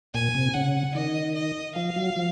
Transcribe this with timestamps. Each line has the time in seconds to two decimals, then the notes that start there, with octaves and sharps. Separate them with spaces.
0.15 A#2 G#5
0.35 C3
0.54 C#3 F#5
0.95 D#3 D#5
1.35 D#5
1.76 F3 F5
1.96 F#3
2.16 F3